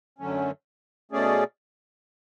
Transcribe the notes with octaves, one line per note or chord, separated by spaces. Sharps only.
F#2 D3 F#3 A3 C#4
B2 A3 C#4 G#4 D5